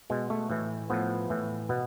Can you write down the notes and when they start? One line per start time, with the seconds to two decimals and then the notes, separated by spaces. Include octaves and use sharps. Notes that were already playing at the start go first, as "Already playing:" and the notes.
0.10 B2 G#3
0.30 A3
0.50 A2 E3
0.90 A2 F3 B3
1.30 A2 E3
1.69 B2 B3